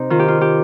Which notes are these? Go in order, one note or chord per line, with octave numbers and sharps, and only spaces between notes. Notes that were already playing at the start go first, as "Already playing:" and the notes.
Already playing: C3 C4 D#4
D#3 F4
G4
F4
G4